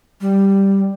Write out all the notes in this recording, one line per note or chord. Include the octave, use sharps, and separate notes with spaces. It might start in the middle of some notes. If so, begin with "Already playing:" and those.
G3